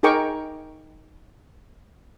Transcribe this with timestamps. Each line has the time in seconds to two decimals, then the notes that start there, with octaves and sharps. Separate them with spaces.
0.03 D#4 G#4 A#4 G5 C#6 D6